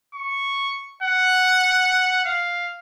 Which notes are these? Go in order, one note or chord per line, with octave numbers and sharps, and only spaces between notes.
C#6
F#5
F5